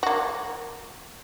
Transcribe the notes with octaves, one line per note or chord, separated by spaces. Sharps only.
A#3 F#4